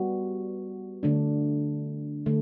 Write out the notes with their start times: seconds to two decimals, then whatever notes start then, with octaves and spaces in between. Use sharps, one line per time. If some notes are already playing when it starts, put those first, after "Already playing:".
Already playing: G3 B3 F#4
1.03 D3 A3 D4
2.26 D3 A3